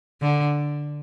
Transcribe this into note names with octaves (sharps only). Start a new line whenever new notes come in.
D3